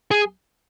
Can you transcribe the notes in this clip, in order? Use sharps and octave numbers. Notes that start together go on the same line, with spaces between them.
G#4